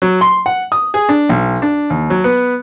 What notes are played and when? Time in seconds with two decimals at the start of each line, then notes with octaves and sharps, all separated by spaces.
0.02 F#3
0.21 C6
0.46 F#5
0.72 D#6
0.94 G#4
1.09 D4
1.29 B1
1.62 D4
1.90 D#2
2.10 F#3
2.24 B3